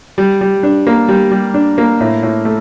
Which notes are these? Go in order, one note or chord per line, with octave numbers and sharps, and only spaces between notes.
G3
G3
D4
A#3
G3
G3
D4
A#3
A2
A2
A3